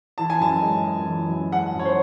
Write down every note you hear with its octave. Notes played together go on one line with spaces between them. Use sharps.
E3 A5
G#5
F#2 A5
G#3
F#2
E3
F#2
G#3 F#5
F#2 C#5
C5